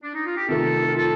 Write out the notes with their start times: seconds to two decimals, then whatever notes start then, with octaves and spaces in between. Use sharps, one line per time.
0.03 D4
0.15 D#4
0.26 F4
0.37 G4
0.48 C3 D#3 A3 F4 A4
0.86 A#4
0.94 F4 A4